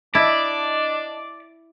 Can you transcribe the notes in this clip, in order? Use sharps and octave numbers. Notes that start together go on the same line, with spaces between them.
D4 E4 D5 D#5 A5